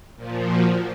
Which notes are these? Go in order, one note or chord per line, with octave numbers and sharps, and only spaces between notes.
A#2 F3
F#4